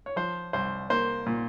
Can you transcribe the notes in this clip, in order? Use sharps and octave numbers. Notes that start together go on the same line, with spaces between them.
C#5
F3 C5
C2 C5
A#3 C5
A#2